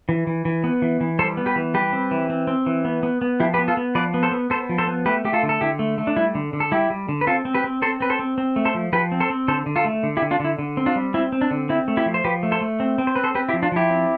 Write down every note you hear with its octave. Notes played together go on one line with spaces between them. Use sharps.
E3
E3
E3
B3
E3
E3
G3 A4 C5
B3
G4 B4
E3
G3 G4 B4
C4
E3
C4
C4
E3
B3
B3
B3
F3 E4 G4
G4 B4
B3
F4 A4
B3
F3 B4 D5
B3
A4 C5
B3
B3 A4 C5
F3
A4 C5
B3
A3 G4 B4
A3 G4
F4 A4
D3
A4
D3 E4 G4
A3
A3
D4
G3 E4
D3
D3
A4
G3 E4 G4
G3
D3
B4
C4 F4 A4
C4
G4 B4
C4
C4 A4 C5
C4 B4
A4 C5
C4
C4
A3
A4 C5
F3
F3 G4 B4
C4
A4 C5
C4
D3 A4 C5
D3
F4 A4
A3
D3
E4 G4
D3
D4 F4
D3 E4
D3
C4
D4 F4
G3
C4 E4
C4
D4
D3
C4 E4
A3
E4 G4
F3
C5
F3 G4 B4
A3
A4 C5
A3
C4
C4
C5
C4 B4
A4 C5
C4 G4 B4
E4 G4
F3
D4 F4
F3 E4 G4
C4